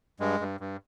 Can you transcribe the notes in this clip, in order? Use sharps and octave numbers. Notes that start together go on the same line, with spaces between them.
G2 G#3
G2
G2